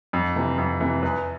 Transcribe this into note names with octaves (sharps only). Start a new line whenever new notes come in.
F2
C3 E3
F2
C3 E3
E2 B4